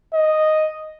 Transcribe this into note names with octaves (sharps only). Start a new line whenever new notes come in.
D#5